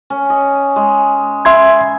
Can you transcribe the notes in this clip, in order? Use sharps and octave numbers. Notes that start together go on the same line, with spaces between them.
C#4
D#5
G#3
E5 B5 C6 G#6